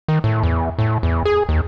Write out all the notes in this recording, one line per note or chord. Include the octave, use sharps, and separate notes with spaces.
D#3
A2
E2
A2
E2
G#4
D#2